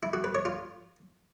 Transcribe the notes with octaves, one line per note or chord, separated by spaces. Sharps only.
E4
F#4
B4
C#5
F4